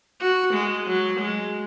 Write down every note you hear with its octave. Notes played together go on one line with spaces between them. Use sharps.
F#4
G#3
F#3
G#3